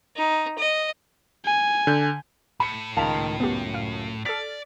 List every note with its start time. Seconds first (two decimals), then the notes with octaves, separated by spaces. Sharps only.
0.17 D#4
0.58 D#5
1.45 G#5
1.87 D3 G6
2.60 A2 B5 C#7
2.96 C#2 D#3 F5 A5 B5 F7
3.40 F#2 B3 G4
3.74 F5
4.25 A4 D5 F6 A6 B6